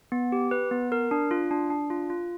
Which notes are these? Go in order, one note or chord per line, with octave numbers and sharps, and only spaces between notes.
B3
G4
B4
B3
A#4
D4
F4
D4
D4
F4
F4